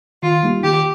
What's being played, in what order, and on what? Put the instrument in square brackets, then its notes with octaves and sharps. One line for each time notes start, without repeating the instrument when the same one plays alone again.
[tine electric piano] D#3 [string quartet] F4
[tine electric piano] G3 A#3 D#4 G4
[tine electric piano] D#3 [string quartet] G4